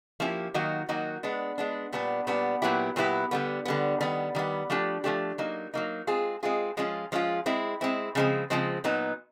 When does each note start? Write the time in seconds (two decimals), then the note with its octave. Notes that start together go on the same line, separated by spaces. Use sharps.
0.20 F3 A#3 C#4 E4 G4
0.54 D#3 F#3 A#3 D#4 F#4
0.89 D#3 F#3 A#3 D#4 F#4
1.23 G#3 B3 D4
1.58 G#3 B3 D4
1.92 A#2 G3 B3 D4
2.27 A#2 G3 B3 D4
2.62 A#2 F#3 B3 E4 G4
2.96 A#2 F#3 B3 E4 G4
3.31 D3 G3 B3
3.65 D3 G3 B3
4.01 D#3 G3 B3
4.35 D#3 G3 B3
4.70 F3 A3 D4 G4
5.04 F3 A3 D4 G4
5.38 F#3 A#3 D#4
5.74 F#3 A#3 D#4
6.07 G#3 C4 F4 G#4
6.43 G#3 C4 F4 G#4
6.77 F3 G#3 C#4 F4
7.12 F3 G#3 C#4 F4
7.46 G#3 C4 E4
7.81 G#3 C4 E4
8.15 C#3 F3 G#3 C4
8.50 C#3 F3 G#3 C4
8.84 A#2 F#3 B3 D#4